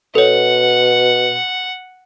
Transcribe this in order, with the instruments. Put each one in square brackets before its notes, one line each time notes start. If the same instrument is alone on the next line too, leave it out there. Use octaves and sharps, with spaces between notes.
[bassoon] B2 [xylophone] A4 C#5 [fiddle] F#5